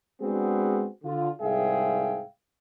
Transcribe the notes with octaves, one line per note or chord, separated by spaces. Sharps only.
G#3 B3 C4 D4 F#4 G#4
D3 F4
C2 G#2 G#4 E5 F5 G5